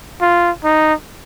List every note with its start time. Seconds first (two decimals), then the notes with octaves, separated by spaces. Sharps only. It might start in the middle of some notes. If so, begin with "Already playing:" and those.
0.21 F4
0.64 D#4